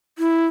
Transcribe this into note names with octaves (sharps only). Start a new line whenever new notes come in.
E4